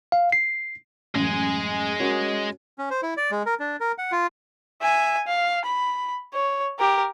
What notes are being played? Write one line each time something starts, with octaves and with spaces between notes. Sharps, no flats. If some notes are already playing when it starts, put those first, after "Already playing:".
F5
C7
A1 F#2 G#3 G#4
C#4 F#4 A#4
C#4
C5
E4
D5
G#3
A#4
D4
A#4
F#5
F4
E5 G#5
F5
B5
C#5
G4 A#4